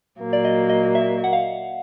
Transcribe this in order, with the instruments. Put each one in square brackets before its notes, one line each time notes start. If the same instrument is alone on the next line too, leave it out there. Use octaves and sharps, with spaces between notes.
[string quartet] A#2 F#3 A#3
[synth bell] D5
D#5
D#5
E5
F#5
F5